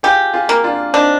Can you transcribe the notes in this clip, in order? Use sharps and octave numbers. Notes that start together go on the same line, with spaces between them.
F4 G4 G#4
F4 G#4
A#3
D4 F4
C4 D4 D#4